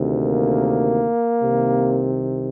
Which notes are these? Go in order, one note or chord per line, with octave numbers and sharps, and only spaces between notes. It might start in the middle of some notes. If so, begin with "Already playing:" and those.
Already playing: D2 C3 D#3
A#3
C2 C3 D#3